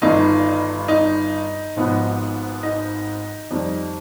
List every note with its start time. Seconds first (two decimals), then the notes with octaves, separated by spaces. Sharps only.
0.02 G1 G2 D#3 D#4
0.88 D#4
1.76 G#1 G#2 F3 B3
2.63 D#4
3.51 F2 D#3 G3